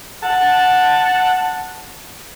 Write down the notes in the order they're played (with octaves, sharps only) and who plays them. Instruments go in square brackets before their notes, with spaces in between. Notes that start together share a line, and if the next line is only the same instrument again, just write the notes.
[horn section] F#5 A5